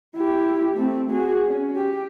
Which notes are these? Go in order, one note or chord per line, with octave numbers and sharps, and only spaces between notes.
E4 G4
A3 C4
F#4 G#4
C#4
G4